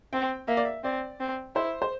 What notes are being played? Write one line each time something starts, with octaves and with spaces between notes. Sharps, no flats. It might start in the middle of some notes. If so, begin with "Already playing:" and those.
C4 G5
A#3 E5
D5
E5
C4 D5
C4
E4 C5
C5